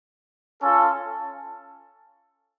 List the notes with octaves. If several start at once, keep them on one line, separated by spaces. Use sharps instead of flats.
C#4 F4 A4